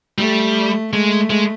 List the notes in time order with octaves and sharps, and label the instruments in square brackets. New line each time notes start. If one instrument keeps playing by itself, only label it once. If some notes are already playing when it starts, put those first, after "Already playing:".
[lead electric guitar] G3 [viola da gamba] A3
[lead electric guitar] G#3 [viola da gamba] A3
[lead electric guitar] G#3